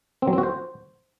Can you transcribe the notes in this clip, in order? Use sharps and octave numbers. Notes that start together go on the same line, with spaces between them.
C4
F#3
C4
F#4
C5